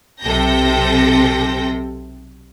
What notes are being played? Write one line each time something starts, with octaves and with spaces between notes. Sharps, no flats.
B1 C3 A4 G5 G6 A#6